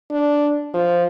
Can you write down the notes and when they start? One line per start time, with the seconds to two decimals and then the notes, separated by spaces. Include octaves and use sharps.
0.11 D4
0.74 F3